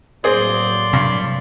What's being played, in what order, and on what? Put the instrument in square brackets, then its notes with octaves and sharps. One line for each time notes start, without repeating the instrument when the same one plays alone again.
[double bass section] A2 F#3 A#3 [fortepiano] C4 G#4 [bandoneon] D5 C6
[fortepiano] G2 [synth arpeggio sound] C3